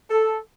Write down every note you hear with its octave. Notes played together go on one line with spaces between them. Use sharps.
A4